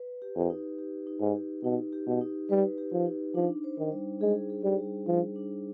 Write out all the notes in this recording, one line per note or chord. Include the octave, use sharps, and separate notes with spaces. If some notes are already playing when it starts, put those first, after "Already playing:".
Already playing: B4
G4
F2
D#4
G4
D#4
G#2
G4
B2 D#4
G4
B2
D#4
G3 B4
G4
F3
D#4
F3 D4
C5
D#3
G3
G#3 G#4
G#4
G3
G3
F3 G3
D4